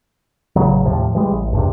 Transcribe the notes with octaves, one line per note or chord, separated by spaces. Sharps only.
A1 C#3 F#3
D#2 A2 C3 F3
E3 G3 G#3
A1
E2 G2 C3